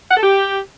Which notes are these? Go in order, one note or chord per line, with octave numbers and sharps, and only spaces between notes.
F#5
A4
G4